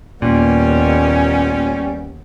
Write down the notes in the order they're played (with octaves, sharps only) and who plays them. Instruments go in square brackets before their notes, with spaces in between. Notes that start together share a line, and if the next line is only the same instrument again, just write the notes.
[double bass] D#2 B3 [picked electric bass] A#2 [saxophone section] G3 C#4